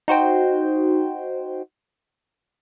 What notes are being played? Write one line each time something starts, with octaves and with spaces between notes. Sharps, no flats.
D#4 F#4 C5 G5